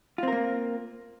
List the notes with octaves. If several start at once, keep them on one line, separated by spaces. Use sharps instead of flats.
A#3 C4 F4 A#4